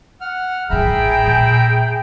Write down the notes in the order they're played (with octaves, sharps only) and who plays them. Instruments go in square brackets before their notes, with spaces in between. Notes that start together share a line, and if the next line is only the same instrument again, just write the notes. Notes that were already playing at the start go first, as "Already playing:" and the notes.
[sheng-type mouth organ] F#5 F6
[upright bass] A1 G#2 [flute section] G#4 G5 G6 [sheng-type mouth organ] E5 A#5 B5
[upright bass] A#2